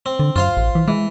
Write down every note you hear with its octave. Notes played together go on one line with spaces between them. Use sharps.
C4
D3
F#2 F4 C5 F5
A1
E3
E3 G#3